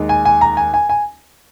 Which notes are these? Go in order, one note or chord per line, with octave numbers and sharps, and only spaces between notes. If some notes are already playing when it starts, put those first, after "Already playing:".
Already playing: D#2 D#3 G#3 D#4
G#5
G#5
A#5
G#5
G#5
G#5